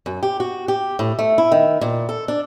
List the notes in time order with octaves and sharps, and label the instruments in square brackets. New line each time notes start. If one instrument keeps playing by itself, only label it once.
[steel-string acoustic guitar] F#2
G4
F#4
G4
A2
A3
E4
D#3
A#2
A4
D4